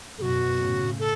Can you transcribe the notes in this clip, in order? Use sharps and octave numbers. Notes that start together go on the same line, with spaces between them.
F#2 B2 F#4 A4
A2 C#3
A4